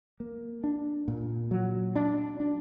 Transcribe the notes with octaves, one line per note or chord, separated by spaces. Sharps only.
A#3
D4
A#2
F#3
D4
D4